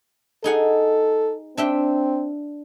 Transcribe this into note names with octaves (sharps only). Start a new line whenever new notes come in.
D#4 G#4 A4 F#5
C4 D4 E5 G5